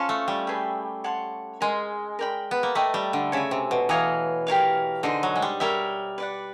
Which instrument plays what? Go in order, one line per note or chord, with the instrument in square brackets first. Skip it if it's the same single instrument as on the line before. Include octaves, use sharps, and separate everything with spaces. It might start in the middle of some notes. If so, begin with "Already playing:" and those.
Already playing: [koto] C#4 [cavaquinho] F4 A4 C5 F5
[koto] A3
G3
[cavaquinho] G#4 B4 E5 G5
C#5 F#5 A5 C6
[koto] G#3 [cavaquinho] A#4 D#5 G#5 C6
[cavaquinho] A#4 D5 G5 B5
[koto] B3
A#3
[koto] A3 [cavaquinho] B4 D#5 G5 A#5
[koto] G3
D3
[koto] C#3 [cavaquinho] C#5 E5 G#5
[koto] C3
B2
[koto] E3 [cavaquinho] C#5 F5 A#5 D#6
[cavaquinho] G4 A#4 C#5 F5
[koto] D3 [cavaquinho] D#4 G#4 C5
[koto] F#3
G#3
G3
[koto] G3 [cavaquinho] A#4 C#5 E5
[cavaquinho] B4 D5 F#5